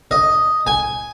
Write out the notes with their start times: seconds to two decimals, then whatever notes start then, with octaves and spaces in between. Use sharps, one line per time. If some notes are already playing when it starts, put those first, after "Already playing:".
0.11 D#5
0.67 G#5